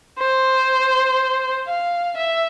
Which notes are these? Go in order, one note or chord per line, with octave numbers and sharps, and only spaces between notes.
C5
F5
E5